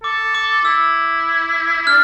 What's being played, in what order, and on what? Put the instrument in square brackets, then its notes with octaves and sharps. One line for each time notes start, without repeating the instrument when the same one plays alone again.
[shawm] A4 [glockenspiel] D6
[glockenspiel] D6
[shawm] E4 [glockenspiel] E6
[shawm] E4
[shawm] D4 [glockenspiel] F6